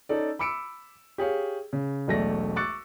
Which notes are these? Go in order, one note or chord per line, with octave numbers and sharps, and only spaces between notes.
C#4 D#4 A4 D5
B5 D6 E6 C#7 D7
G4 G#4 C#5 F5
C#3
E1 B1 A3 D5 A#6
C#6 D6 E6 F#6 A6 C#7